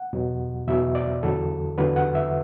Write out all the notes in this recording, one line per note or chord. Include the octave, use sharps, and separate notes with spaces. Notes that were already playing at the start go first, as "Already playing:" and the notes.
Already playing: F#5
E2 B2 F#3
E2 B2 F#3 E5
D5
E2 D3 F#3 A4
E2 D3 F#3 B4
F#5
E5